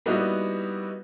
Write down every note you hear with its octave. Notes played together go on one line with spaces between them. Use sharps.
G3 A#3 B3 D#4 E4 F#4